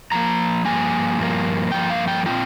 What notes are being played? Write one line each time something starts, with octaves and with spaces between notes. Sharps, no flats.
G2 F3 A#3 A#5
G2 F3 A#3 G#5
G2 F3 A#3
G2 F3 A#3 G5
F5
G5
A#2 G#3 C4 F4 G5